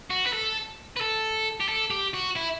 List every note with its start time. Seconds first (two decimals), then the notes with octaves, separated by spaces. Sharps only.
0.11 F#4
0.27 B4
0.34 A4
0.97 B4
1.01 A4
1.61 G4
1.69 A4
1.90 G4
2.13 F#4
2.35 E4